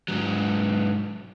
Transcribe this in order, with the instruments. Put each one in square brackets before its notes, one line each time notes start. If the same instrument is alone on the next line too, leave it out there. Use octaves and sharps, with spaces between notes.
[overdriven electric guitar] G#2 F#3